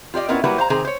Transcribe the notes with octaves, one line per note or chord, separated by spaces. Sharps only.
F4 G4 D5 D#5
B3 C#4 E4 F4 A#4 D#5
F#3 G3 A#3 E4 F#4 B4
C5 F5 A#5
C3 D#3 G#4 C5 G#5 A#5
C5 C#5